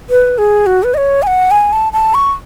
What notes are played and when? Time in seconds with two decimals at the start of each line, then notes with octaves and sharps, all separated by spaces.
0.10 B4
0.38 G#4
0.66 F#4
0.83 B4
0.94 D#5
0.97 C#5
1.23 G#5
1.27 F#5
1.51 G#5
1.72 A5
1.93 A5
2.14 C#6